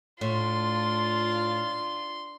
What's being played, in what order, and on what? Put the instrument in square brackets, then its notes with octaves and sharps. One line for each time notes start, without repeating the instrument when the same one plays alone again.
[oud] A2 [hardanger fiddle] D4 F4 [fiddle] C6